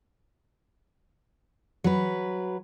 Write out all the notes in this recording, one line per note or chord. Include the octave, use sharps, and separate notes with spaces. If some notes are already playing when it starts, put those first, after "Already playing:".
F#3 B4